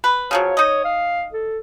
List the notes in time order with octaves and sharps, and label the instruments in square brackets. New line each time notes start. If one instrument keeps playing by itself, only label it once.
[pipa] B4
[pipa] C#3 F3 F#3 [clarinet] C#5
[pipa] D#4 D#5
[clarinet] F5
A4